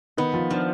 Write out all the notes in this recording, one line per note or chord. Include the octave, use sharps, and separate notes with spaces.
D#3 B3 D#4
F3 F4
F3 D4